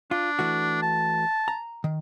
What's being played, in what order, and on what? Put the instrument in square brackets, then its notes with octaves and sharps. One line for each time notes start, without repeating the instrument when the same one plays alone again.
[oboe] D4 [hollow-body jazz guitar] F4
[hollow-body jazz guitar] E3 A3 F#4
[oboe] A5
[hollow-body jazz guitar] A#5
D#3